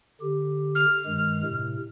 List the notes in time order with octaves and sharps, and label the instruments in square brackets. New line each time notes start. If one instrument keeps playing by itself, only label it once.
[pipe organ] D3 G4
[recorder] F6
[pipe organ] G2 D#3 G#3
A2 C3